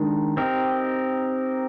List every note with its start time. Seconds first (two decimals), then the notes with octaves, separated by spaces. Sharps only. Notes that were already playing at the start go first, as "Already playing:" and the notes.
Already playing: D#3 G#3 D4
0.37 C4 D#4 G4 A#4